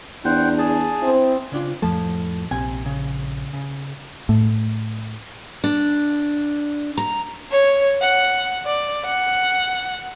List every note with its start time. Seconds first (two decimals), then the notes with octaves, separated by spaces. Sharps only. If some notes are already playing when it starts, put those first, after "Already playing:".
0.25 E2 D4 C5 F#5 G5
0.58 G#4 A5
1.02 C4 E4
1.52 C#3 D4 F4
1.82 F2 A2 F3 A3 A5
2.51 A#1 C3 C4 G#5
2.86 C#3
3.53 C#3
4.29 A2
5.64 D4
6.98 A#5
7.52 C#5
8.02 F#5
8.66 D5
9.06 F#5